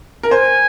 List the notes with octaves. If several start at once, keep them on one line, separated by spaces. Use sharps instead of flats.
A#4
C5 G#5